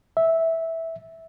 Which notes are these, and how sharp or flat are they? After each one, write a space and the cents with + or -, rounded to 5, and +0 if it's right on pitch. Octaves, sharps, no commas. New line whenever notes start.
E5 -10